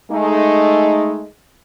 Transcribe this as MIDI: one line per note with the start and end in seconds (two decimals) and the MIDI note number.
0.10 1.24 56
0.10 1.24 57
0.10 1.24 63